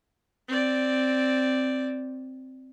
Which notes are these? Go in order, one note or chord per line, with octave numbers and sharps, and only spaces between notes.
C4 D5